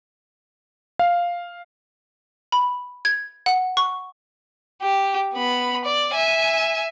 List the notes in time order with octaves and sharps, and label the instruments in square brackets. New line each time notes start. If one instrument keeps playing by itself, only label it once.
[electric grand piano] F5
[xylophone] B5
G#6
F#5
C#6
[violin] G4
B3 B5
D5
E5 G#5